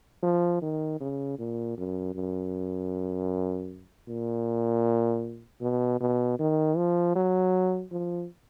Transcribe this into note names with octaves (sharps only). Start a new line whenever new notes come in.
F3
D#3
C#3
A#2
F#2
F#2
A#2
B2
B2
D#3
F3
F#3
F3